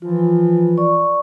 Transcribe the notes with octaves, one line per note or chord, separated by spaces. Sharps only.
E3 F3 F4
D5 C#6